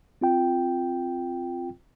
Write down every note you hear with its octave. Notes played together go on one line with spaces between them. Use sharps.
C4 F4 G5